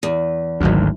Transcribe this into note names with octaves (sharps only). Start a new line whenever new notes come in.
E2
G#1 D2 D3 F#3 D#4